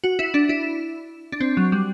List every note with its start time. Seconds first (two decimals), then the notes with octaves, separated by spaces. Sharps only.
0.04 F#4
0.19 E4
0.34 D4
0.49 E4
1.32 D4
1.41 C4
1.57 F#3
1.72 G3